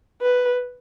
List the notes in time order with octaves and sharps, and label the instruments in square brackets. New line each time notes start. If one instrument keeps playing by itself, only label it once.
[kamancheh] B4